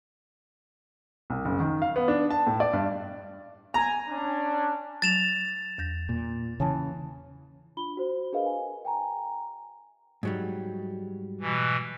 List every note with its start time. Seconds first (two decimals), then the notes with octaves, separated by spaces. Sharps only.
1.30 C2
1.45 F#1
1.60 D#3
1.82 F5
1.96 B3
2.08 D4
2.30 A5
2.47 A2
2.60 D5
2.73 G2
3.74 G#5 A#5
4.07 C#4 D4
5.02 F#3 A6 E7 F7
5.78 E2 G6 A#6
6.09 A#2
6.60 C#3 E3 C#5 G#5 A5
7.77 D4 F4 B5 G7
7.97 F#4 C5
8.32 D4 G#4 A#4 B4 D#5 F5
8.46 G#5
8.85 G5 G#5 A#5
10.23 G#2 F#3 G3
11.40 B2 E3